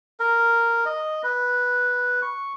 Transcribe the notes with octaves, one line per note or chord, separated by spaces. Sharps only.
A#4
D#5
B4
C#6